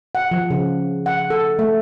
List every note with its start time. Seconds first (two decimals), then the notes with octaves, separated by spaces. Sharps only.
0.15 F#5
0.31 F3
0.50 C#3
1.06 F#5
1.30 A4
1.59 A3